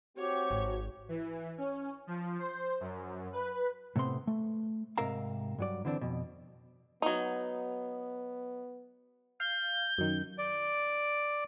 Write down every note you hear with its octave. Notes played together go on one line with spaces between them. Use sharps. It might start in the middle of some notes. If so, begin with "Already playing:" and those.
C4 F#4 G4 C#5
G#1
E3
C#4
F3
C5
F#2
B4
A2 C3 B3 C4 C6
A3
G#2 C3 A#4 E5 F5 A#5
G2 F#3 D5
D3 E3 C4 D4
F2 B2
F#3 B3 D#4
F5 G6
F#2 D#3
D5